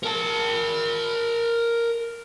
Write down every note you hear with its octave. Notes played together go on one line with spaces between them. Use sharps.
A#4 A5